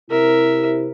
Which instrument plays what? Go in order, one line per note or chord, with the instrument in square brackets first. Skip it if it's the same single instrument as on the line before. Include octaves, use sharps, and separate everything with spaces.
[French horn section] C3 E4 [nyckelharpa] A#4 E5